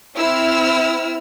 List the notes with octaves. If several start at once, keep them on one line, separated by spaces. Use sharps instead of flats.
C4 E4 E6 F6